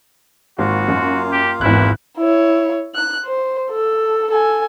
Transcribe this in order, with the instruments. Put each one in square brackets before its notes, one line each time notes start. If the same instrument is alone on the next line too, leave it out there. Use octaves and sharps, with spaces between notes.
[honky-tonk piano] G#1 [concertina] A#3 F4 F5 [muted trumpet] F#4
[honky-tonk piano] F#2
[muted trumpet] G4
[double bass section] G#1 [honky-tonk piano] E2 F#6 [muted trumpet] E4
[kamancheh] E4 C#5
F#6
C5
A4
A4 G#5